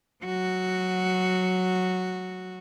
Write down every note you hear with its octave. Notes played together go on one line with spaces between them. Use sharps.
F#3 F#4